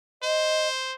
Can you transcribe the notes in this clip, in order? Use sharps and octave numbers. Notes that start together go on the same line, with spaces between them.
C5 D#5